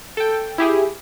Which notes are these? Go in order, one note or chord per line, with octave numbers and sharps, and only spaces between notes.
A4 G5
E4 G4 G#4